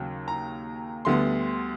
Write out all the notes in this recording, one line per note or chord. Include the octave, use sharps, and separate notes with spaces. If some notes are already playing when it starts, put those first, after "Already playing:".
Already playing: D#2 C#3 F#3
A#5
D2 D3 G3 B3 C6